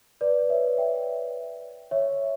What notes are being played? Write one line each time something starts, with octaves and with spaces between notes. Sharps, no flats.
B4 D5
C#5 E5
E5 G5
C#5 E5